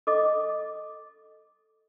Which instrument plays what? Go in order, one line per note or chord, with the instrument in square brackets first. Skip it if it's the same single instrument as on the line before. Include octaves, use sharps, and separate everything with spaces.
[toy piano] A4 D#5 D6